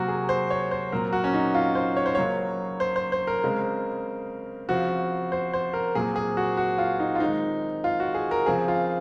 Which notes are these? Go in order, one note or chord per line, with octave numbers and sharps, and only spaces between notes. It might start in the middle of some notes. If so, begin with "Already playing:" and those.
Already playing: C3 F#3 A#3 F#4 A#4
G#4
C5
C#5
C5
A#2 F#3 C4 A#4
F#4
C#4
D#4
F4
C5
C#5
C5
C#3 F#3 A#3 C#5
C5
C5
C5
A#4
C#3 G#3 C4
C#3 F3 C4 F#4
C5
C5
A#4
A#2 F#3 C4 G#4
G#4
F#4
F#4
F4
D#4
F4
D#3 G#3 C4 D#4
F4
F#4
G#4
A#4
C#3 F3 C4 G#4
F4